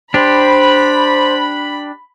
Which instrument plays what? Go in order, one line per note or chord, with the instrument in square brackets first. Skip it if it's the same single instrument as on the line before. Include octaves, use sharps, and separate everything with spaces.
[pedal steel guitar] D4 G4 [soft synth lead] C5 [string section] B5